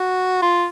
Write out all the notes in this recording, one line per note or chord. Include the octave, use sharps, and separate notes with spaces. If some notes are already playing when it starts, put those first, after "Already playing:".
Already playing: F#4
F4